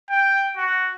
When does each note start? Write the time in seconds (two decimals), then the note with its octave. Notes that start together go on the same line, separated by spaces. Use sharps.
0.10 G5
0.57 F#4